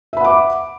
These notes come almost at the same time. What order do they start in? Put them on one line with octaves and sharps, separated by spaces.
E5 B5 F#5 D6